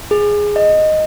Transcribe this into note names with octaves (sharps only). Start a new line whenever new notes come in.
G#4
D#5